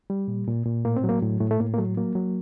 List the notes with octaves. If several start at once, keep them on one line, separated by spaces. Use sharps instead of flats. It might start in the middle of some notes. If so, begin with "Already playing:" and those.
G3
A#2
A#2
A#2
A2 A#3
C4
F#3 A#3
A2
A2 A3
A3
A2 A#3
A#3
F#3 A3
F#3 A#3
F#3